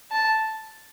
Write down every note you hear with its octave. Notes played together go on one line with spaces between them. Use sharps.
A5